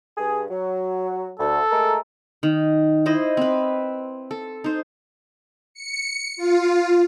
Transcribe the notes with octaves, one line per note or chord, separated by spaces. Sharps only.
G2 G#4
F#3
D2 A4
G#3 A3 A#4
D#3
E4 C5 D#5
C4 B4
A4
D#4 C5
C#7
F4